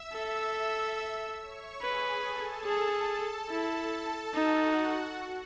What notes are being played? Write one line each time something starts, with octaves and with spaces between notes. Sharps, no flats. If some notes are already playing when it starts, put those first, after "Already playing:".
Already playing: E5 E6
A4
C#5 C#6
G#4 B4 G#5
A4 A5
G#4
E4
D#4 F#4 F#5